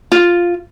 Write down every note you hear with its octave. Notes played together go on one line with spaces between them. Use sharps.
F4